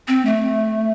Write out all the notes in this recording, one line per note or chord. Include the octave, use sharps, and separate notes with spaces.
C4
A3